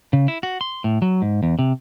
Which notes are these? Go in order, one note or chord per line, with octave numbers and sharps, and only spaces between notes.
C#3
E4
F#4
C6
A2
F#3
G#2
E2
C3